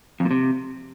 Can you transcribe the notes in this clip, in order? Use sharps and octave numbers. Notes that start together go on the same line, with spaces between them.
F2
A#2
C3